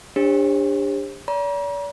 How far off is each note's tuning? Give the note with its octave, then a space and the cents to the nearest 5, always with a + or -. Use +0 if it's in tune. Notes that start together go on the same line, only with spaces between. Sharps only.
D4 +0 G4 +35 C5 +45
D5 -45 A#5 +40